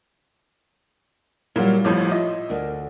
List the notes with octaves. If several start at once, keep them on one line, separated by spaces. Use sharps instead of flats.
A#2 F#3 G3 E4 A#4
A1 A2 F3 C#5
F4 D#5 E5
D2 D4 A#4